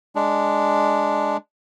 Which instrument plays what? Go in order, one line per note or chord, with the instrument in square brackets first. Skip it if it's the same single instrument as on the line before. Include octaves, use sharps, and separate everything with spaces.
[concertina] G#3 D4